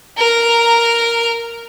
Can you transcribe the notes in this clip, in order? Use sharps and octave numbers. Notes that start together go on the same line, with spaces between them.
A#4 A#5